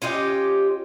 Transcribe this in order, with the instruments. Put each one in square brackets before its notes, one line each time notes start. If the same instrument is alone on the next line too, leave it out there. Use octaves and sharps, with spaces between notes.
[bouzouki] C#4 F4 G4 D#5